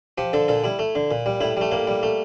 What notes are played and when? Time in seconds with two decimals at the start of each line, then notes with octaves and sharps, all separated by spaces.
0.18 F3 G4
0.33 D3 A4
0.48 A#2 A4
0.64 G3 E4
0.79 A3
0.95 D3
1.11 A#2
1.26 G3
1.41 A2 E4
1.57 G3 A3
1.71 A2 A#3
1.87 G3
2.03 A3